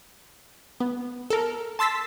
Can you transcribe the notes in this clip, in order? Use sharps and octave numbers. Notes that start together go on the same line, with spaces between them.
B3
A4 A#4
A5 C6 E6 A6 B6